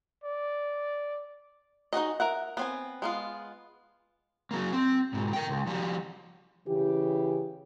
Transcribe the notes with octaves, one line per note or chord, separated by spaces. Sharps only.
D5
D#4 F#4 G#4 D#5
A#4 E5 F#5
B3 C4 G#5
G#3 B3 F4
F#3 A#3
C4
G#2 B2
A#4 G5
C#2
F3 G3
C#3 E3 G4